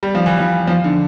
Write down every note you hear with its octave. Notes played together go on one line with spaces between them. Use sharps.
G3
F3
E3
F3
F3
D3